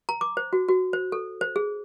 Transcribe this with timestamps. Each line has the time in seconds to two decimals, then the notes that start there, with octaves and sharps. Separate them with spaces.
0.09 A#5
0.21 D6
0.37 C5
0.53 F#4
0.68 F#4
0.93 C5
1.12 A4
1.41 C5
1.56 G#4